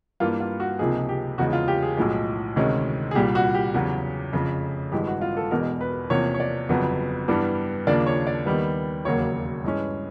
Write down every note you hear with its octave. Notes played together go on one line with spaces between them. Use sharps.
G2 E3 G3 A#3 F4
F4
F#4
C#2 C3 F3 A#3 D#4 G#4
G4
E2 C#3 F3 G#3 F#4
F4
G4
G#4
B1 A2 F3 G#3
D2 C3 D#3 G#3 C#4
G#4
C2 A#2 G3 G4
F#4
G4
E2 C#3 F#3
F1 F2 C#3
G#1 G2 E3 G#3 G4
F#4
F4
A4
E1 E2 B2 G#3 A#4
B4
E2 C3 F3 A#3 C#5
C#5
D5
G1 F2 C#3 F#3 B3
G2 E3 G3 B3 D4
D#2 C#3 F3 A#3 D4 D5
C#5
D5
D#2 D#3 G3 B3
E1 D#2 C#3 F#3 A#3 C#5
G2 E3 G#3 C#4